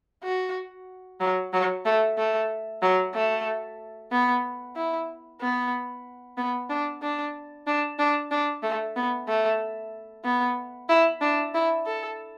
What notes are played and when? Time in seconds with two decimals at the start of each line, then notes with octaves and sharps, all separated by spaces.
0.24 F#4
1.21 F#3
1.53 F#3
1.86 A3
2.18 A3
2.83 F#3
3.15 A3
4.12 B3
4.76 E4
5.41 B3
6.38 B3
6.70 D4
7.02 D4
7.67 D4
7.99 D4
8.31 D4
8.63 A3
8.96 B3
9.29 A3
10.24 B3
10.89 E4
11.21 D4
11.54 E4
11.86 A4